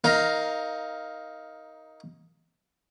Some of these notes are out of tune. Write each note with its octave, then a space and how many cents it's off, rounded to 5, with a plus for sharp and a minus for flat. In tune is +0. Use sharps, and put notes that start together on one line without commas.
D#4 +15 A#4 +0 F5 +0